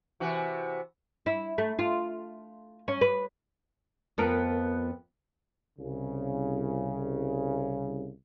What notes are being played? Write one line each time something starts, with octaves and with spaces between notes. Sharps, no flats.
C3 E3 F#4
E4
A3
F4
C#4
B4
F2 B3 A#4
C2 C#3